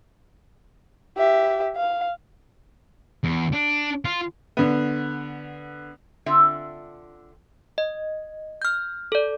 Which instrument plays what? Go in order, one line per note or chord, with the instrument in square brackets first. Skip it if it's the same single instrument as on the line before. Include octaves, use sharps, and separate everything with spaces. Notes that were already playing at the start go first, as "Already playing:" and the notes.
[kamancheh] G4 E5
F5
[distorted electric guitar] E2
D4
F4
[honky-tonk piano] D3 B3
[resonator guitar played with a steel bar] D3 C4 D4 F4 E5
[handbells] D#5
F6 G6
A4 D5